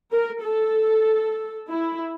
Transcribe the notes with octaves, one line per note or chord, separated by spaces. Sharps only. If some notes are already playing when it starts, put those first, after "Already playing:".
A#4
A4
E4